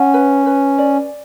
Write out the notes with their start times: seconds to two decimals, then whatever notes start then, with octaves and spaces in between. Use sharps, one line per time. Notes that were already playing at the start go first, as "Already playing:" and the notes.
Already playing: C#4 F#5
0.14 B4
0.46 B4
0.78 D5